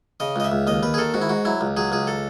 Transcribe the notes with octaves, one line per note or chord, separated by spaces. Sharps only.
C#3 D#5
C#2 D#5
E5
C#2
D#2 D#5
D#2 B4
G#4
D#3 A4
G#2 F#4
E4
G#2 F#4
F#3 E4
C#2
F#3 G#4
C#2 G#4
A4